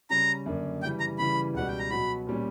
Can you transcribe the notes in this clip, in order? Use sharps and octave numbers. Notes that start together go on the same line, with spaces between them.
C#3 G3 C#4 A#5
F#2 D3 A#3 D4
C#3 E3 G3 G5
A#5
C#3 E3 G3 B5
C#2 B2 G3 F#5
G5
A#5
B2 F#3 B3 F#4 B5
A#2 G3 C#4